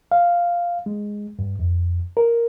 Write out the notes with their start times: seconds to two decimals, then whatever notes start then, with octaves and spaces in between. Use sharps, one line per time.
0.12 F5
0.86 G#3
1.39 G2
1.59 F2
2.17 A#4